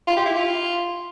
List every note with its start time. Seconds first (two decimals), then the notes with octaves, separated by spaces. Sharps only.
0.07 F4
0.16 G4
0.26 E4
0.35 F4